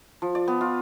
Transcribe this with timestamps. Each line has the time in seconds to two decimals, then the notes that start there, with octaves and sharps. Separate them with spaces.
0.22 F3
0.35 D5
0.48 B3
0.61 F4